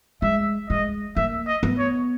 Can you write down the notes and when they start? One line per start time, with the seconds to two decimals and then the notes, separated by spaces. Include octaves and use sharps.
0.22 G#3 E5
0.70 G#3 D#5
1.16 A#3 E5
1.47 D#5
1.63 B3
1.79 C#5